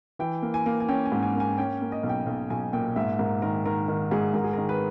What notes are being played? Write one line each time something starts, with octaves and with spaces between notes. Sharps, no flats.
E3 G5
A#3
G#5
A#3
G#5
C#4 G5
G#5
G#2
G#5
A#3
G#5
C#4 G5
A#3
D#5
B1
G5
B1
B1 G#5
A#2 G5
G#2 E5
G#2 A#4
D#3 A#4
D#3 A#4
D#3 A#4
G#2 G#4
G#2 A#4
G#4
D#3 A#4
B4